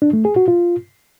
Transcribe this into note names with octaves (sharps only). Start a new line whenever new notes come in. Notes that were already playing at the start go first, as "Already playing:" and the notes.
D4
A3
G#4
F#4
F4